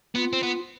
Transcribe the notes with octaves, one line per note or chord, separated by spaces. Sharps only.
B3 F4
C4
B3